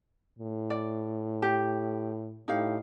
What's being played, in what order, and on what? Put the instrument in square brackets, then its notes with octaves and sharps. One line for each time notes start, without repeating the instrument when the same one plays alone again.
[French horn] A2
[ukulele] D5
G4
[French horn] A2 [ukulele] D#4 G4 F5